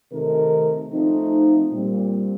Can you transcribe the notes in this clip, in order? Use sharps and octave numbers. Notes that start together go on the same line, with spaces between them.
C3 D#3 A3 D#4 A#4
F3 A3 C4 D#4
A#2 G3 C4